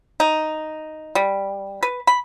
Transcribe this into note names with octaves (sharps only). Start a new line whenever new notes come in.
D#4
G3
B4
B5